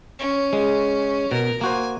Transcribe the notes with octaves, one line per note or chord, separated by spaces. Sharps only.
C#4
G#3
B2 A#4
A#3 F#4 C5 G#5